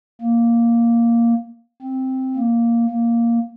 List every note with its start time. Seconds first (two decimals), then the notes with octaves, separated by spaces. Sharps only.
0.21 A#3
1.82 C4
2.36 A#3
2.89 A#3